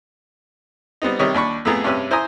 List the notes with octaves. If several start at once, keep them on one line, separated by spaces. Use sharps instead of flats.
G3 B3 C4 D#4
C3 D#3 G3 C#5 D#5
D#2 D4 B5 C#6
F2 A2 A3 B3 G#4 A#5
G2 C3 C#4 B4 E6
E4 C5 G#5 A#5 D#6